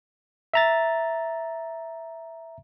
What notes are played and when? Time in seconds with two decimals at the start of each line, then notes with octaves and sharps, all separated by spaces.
0.54 E5 A#5 A6